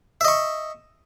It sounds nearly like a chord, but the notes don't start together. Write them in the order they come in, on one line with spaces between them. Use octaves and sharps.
E5 D#5 C#6